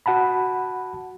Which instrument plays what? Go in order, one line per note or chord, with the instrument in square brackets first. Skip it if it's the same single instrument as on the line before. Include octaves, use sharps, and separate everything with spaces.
[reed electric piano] F#4 F#5 A5 B5